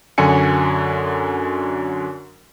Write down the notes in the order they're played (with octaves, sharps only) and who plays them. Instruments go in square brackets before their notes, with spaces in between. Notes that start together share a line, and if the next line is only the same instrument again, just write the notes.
[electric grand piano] F#2 D3 F#4 G#5 C#7